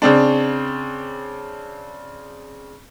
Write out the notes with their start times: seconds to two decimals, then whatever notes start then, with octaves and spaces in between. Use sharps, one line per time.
0.02 C#3 C4 D4